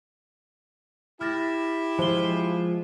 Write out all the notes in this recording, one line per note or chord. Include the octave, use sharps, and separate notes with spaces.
E4 G4 F6 A6 A#6
F3 G#3 F4 C5 G7